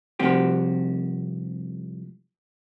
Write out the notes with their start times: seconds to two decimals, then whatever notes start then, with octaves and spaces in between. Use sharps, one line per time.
0.19 C2 F2 C4 F#4 G4